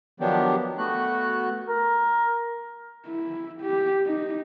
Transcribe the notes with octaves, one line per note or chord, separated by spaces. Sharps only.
D#3 F3 F#3 B3 D4 G4
A3 B3 F#4 F#6
A#4
E4
G4
D#4